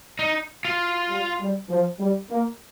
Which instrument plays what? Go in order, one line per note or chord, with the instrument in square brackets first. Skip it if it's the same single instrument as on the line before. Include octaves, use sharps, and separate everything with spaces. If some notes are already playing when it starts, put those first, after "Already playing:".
[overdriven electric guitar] D#4
F4
[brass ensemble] G3
G3
F3
G3
A#3